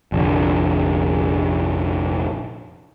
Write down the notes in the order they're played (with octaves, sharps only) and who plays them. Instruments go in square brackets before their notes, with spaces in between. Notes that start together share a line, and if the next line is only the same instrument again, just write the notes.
[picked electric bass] F1 A#1 D3